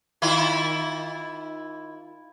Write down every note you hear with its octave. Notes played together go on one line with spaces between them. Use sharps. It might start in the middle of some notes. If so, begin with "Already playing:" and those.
D#3 E4 F4